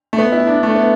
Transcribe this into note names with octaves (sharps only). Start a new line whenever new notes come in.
A3
B3
E4
D4
A3
B3